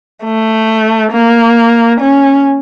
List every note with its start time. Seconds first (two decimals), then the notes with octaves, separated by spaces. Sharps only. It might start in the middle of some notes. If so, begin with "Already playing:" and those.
0.24 A3
1.13 A#3
2.01 C#4